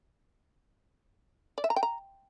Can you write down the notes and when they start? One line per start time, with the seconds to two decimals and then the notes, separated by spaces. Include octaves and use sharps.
1.58 D5
1.64 E5
1.70 A#5
1.76 G5
1.83 A#5